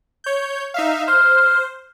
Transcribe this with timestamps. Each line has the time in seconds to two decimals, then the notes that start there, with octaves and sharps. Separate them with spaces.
0.24 C#5 G6
0.74 D#4 E5 F5
1.08 C5 F6